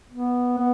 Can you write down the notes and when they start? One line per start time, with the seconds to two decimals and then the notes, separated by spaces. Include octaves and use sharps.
0.12 B3
0.58 B3